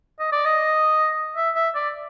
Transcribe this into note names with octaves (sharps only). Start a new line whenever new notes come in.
D#5
D5
D#5
E5
E5
D5